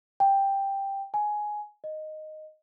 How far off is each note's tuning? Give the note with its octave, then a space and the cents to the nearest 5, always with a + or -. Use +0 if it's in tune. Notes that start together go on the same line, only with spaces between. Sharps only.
G5 +5
G#5 +10
D#5 -5